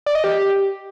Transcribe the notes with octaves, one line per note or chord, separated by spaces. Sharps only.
D5
D#5
G4